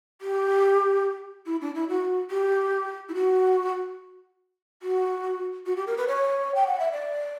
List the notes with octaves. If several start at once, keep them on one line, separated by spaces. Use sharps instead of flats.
G4
E4
D4
E4
F#4
G4
E4
F#4
F#4
F#4
G4
A#4
B4
C#5
G5
F#5
E5
D5